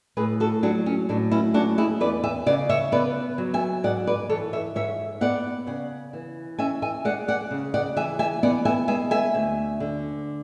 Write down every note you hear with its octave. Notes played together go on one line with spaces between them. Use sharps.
A2 G#4 B4
F#4 A4
F#3 D4 F#4
C#4
A2 D4
C#4 E4
C#4 D4 F#4
E4 G#4
E2 B4 D5
E5 G#5
C#3 D5 F#5
C#5 E5
B3 B4 D5
F#3
E5 G#5
G#2 D5 F#5
B4 D5
E3 A4 C#5
C#5 E5
G#2 C#5 E5
B3 D5 F#5
C#3 D5 F#5
E3
C#4 E5 G#5
E5 G#5
G#3 D5 F#5
D5 F#5
C#3
D5 F#5
E3 E5 G#5
E5 G#5
B3 D5 F#5
E5 G#5
G#3 E5 G#5
E5 G#5
D2
D3